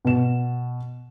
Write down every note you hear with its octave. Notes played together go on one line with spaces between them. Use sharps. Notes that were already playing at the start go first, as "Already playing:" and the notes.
B2 E7